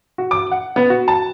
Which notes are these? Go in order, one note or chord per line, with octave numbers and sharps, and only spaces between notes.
F#4
D6
F#5
B3
F#4
A5